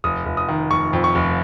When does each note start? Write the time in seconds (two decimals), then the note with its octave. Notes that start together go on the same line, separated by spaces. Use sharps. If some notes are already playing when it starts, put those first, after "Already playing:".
0.04 F1 D#6
0.26 F1
0.37 D#6
0.48 D#3
0.71 F1 C#6
0.93 F2
1.04 C#6
1.15 F1